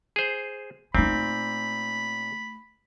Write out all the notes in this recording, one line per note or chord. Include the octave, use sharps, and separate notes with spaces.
G#4 C5
A#2 A3 C4 D#4 B5